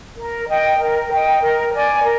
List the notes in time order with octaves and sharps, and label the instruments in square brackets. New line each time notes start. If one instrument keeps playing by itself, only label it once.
[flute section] A#4
D#5 G5
A#4
D#5 G5
A#4
D5 G#5
A#4